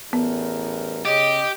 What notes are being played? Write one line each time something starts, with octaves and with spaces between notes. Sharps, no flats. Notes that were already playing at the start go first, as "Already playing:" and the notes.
A1 E2 B3 A#4
C#3 G4 D#5